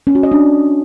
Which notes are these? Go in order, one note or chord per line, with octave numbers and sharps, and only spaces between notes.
C#4
F#4
D#5
D4